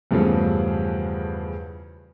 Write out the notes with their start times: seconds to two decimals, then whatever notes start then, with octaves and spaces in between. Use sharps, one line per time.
0.11 E2 G2 C#3 F3 A3